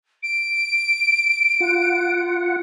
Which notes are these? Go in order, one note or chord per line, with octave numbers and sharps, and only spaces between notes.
D7
F4 F#5